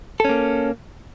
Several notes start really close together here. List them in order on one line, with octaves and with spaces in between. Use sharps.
A4 C#4 A#3